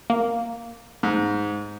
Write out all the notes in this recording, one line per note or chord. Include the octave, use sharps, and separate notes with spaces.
A#3
G#2